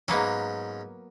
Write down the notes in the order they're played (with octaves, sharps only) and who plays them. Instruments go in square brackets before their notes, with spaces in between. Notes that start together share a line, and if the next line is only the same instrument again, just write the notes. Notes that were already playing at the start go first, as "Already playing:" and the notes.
[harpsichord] G#2 C#4 [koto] F#3 A#3 B3